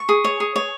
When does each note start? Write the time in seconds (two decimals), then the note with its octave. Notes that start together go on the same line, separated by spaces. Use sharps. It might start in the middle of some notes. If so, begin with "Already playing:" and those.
Already playing: C#6
0.09 G#4
0.24 C#5
0.40 G#4
0.56 C#5